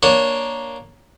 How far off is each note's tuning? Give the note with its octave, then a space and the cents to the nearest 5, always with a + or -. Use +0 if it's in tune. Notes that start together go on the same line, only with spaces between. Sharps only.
A#3 +10 D4 +0 C#5 +0